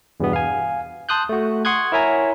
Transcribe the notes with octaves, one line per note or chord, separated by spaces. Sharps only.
E2 G2 B2 B3
F5 G#5
A5 C6 D#6 F#6 G6
A3 F#4
F#5 C6 C#6 D#6 F#6 G#6
E4 A#4 C#5 E5 G#5 A#5